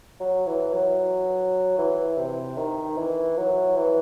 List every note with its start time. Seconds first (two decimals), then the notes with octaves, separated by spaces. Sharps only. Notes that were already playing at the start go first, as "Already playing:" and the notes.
0.20 F#3
0.46 E3
0.72 F#3
1.78 E3
2.18 C3
2.57 D#3
2.98 E3
3.37 F#3
3.76 E3